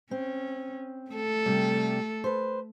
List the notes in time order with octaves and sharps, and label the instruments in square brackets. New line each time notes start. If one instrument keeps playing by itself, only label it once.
[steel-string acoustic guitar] C4 [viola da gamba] C#4
[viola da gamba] A3 A4
[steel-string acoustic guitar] C3 G3
B4 C5